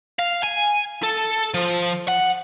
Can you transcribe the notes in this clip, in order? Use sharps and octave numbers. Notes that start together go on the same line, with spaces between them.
F5
G#5
A4
F3
F#5